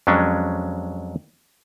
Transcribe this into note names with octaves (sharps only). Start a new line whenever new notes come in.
F2 F#3 G#3 C#4 D4